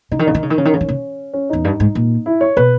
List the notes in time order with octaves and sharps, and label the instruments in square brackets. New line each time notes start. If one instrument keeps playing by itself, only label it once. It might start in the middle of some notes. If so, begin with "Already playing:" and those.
[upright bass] C#3 [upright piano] D#4
[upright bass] D#3
[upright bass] C#3 [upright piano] D#4
[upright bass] D#3
C#3
D#3
[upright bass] C#3 [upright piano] C#4
[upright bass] D#3
C#3
D#3
C#3
[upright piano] C#4
[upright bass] E2 [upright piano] D#4
[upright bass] G2
G#2
A#2
[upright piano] E4
C#5
[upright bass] B2 [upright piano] B4